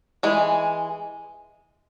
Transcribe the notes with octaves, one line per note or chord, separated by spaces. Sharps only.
E3 G#3